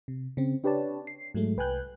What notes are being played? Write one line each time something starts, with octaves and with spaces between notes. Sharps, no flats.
C3
C#3 C4
D4 G4 B4 C#5 D5 A5
C7
G#2 F#3 G#3 A3
C2 B4 G5 G#5 F#6 G6